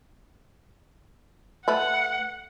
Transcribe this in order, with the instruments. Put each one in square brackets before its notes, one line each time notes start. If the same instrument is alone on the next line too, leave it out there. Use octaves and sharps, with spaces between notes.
[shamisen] A3 B4 E5 [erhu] F#5